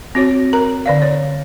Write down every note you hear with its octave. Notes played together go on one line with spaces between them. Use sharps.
C4 F#4 C#5
A#4 A#5
D3 D5 F5
C#5